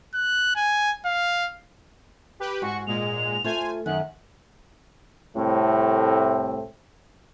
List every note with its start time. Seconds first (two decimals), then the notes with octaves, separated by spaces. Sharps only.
0.14 F#6
0.56 G#5
1.06 F5
2.40 G4 B4
2.62 G#2 F#4 C#6
2.87 A#2 G#3 F7
3.44 A3 F4 C5 G#5
3.86 F#2 D#3 F#6
5.36 C2 A2 A3 C4